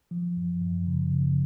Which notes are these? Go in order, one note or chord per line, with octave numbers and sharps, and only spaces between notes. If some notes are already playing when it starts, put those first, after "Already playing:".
F3
F#2
F#2
C#3
C#3